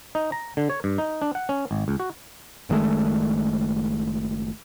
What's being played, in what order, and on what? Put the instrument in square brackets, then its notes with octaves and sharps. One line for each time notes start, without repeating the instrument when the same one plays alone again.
[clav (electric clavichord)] D#4
A#5
D3
C#5
G2
D#4
D4
F#5
C#4
G#1
C#2
F#4
[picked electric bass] F#1 D#3 G#3 A3